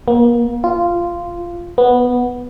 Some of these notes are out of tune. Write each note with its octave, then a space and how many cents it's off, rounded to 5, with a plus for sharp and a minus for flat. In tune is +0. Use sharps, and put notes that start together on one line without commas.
A#3 +35
F4 -10
B3 -5